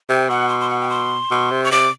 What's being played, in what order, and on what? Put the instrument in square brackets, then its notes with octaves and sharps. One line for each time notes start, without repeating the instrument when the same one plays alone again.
[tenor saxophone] C3 [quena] G5
[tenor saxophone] B2 [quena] F#5
[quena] C6
C6
F#5
G5
C6
[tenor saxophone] B2
C3
[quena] C#6
[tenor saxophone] C3 [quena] D6